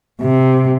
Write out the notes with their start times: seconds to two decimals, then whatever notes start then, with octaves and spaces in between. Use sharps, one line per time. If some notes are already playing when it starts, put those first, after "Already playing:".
0.21 C3